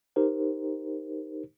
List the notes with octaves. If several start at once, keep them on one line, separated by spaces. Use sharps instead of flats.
D#4 G4 A#4 C5